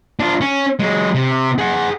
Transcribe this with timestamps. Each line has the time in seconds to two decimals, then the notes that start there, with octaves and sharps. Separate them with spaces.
0.20 D4 F4
0.41 C#4
0.80 F#3 G#3
1.15 C3
1.58 G#4 F#5